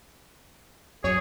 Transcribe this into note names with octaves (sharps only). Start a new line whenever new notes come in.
F#2 G#4 C#5